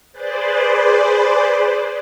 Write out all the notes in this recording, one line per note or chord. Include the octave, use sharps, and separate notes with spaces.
G#4 B4 C5 D5